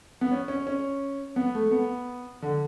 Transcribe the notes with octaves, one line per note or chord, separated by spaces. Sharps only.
B3
C#4
C#4
C#4
B3
A3
B3
D3